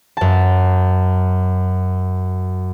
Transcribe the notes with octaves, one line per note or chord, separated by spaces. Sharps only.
F#2 A5